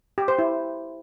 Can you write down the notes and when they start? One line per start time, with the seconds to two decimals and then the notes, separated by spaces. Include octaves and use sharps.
0.18 G4
0.28 C5
0.39 E4